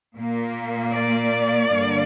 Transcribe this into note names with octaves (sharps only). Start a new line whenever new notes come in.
A#2 A#3
D5
G2 D3 G3 A#3